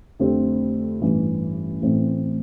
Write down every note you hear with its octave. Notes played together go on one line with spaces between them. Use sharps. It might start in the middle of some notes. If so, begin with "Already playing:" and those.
F2 D3 A3 C4 G4
A1 G2 E3
A1 A2 E3 A3 C4